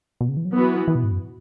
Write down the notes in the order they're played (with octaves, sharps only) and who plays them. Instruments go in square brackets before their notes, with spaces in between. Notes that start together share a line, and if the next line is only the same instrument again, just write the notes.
[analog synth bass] B2
C#3
E3
F#3
[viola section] E3 B3 F#4 B4
[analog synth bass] E3
B2
G#2
F#2